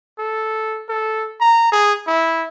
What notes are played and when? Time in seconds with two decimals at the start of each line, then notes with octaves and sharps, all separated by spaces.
0.19 A4
0.89 A4
1.41 A#5
1.72 G#4
2.07 E4